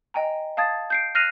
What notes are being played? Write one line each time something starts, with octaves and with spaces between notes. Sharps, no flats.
D#5 G5 G#5 A#5
F5 A5 D#6 G#6 A6
G6 C7 D7
F6 F#6 A#6 C7 D#7 F7